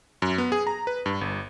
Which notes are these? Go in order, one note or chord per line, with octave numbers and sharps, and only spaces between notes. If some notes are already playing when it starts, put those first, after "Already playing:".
F#2
B3
G#4
A#5
B4
G2
G1